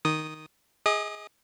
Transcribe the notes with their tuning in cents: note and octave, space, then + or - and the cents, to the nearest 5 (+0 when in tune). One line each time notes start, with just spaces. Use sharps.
D#3 +0 D#6 -5
G#4 +0 D#5 +30 D#6 -40